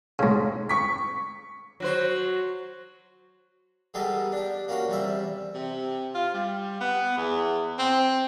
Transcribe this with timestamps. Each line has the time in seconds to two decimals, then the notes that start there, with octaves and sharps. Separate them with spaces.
0.19 G#2 C#3
0.69 C#6 B6
1.80 F#3 F#4 C5
3.94 E3 G3 G#3 B3 A4 A#4
4.32 D4 G4
4.68 A#3 C#4 F#4 A#4
4.88 E2 C3 G3 E5
5.55 C3
6.15 F4
6.34 G3
6.81 B3
7.17 E2
7.79 C4